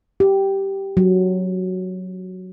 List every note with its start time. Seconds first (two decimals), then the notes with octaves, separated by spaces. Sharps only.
0.20 G4
0.97 F#3